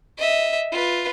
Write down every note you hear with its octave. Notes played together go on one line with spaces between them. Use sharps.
D#5 E5
F4 B4